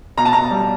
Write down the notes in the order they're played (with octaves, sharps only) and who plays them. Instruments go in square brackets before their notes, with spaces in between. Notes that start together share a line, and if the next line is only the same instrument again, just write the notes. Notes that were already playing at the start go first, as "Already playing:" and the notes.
[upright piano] B2 A#5
A5
B2 A#5
G3